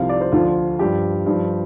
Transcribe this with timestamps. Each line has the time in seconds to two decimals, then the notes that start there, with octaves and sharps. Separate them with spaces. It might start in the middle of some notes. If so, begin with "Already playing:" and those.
Already playing: C2 C3 F3 F5
0.09 D5
0.21 C5
0.32 D2 D3 F3 F4
0.79 G2 F3 G4
1.26 G2 F3